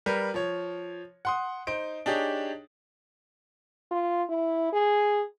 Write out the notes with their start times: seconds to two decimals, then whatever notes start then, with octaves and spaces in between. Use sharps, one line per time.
0.06 G3 A#4 B4
0.34 F3 C#5
1.25 F#5 C6 D#6
1.67 D#4 C5 D7
2.06 D4 D#4 G4 G#4 C#5
3.91 F4
4.29 E4
4.73 G#4